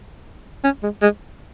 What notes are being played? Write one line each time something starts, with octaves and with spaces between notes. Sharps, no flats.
C#4
G#3
G#3